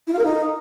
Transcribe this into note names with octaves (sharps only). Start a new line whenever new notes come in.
E4
F4
A#4
D#4